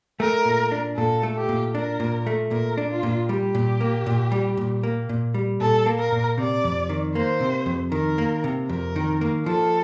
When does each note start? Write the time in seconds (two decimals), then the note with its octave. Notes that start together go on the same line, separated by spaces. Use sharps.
0.20 A3 A#4
0.45 A#2
0.72 D4
0.97 A#2 A4
1.23 A3
1.36 G4
1.49 A#2
1.74 D4 A#4
2.00 A#2
2.27 A3
2.51 A#2 A#4
2.78 D4
2.90 F4
3.03 A#2
3.29 G3 G4
3.55 A#2
3.81 A#3
4.06 A#2
4.32 G3
4.57 A#2
4.83 A#3
5.09 A#2
5.34 G3
5.60 A#2 A4
5.86 A#3
5.99 A#4
6.12 A#2
6.38 C3 D5
6.64 F2
6.89 D#3
7.15 A#3 C5
7.41 C3
7.66 F2
7.92 D#3 A#4
8.18 A#3
8.44 C3
8.69 F2 A#4
8.96 D#3
9.21 A#3
9.46 F3 A4